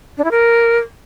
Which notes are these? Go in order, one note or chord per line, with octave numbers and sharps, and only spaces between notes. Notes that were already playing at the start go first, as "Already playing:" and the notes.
D4
E4
A#4